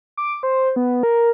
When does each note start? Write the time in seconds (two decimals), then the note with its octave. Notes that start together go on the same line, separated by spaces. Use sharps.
0.17 D6
0.43 C5
0.76 B3
1.03 A#4